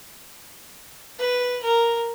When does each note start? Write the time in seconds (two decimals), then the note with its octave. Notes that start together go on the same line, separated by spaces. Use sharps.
1.19 B4
1.63 A#4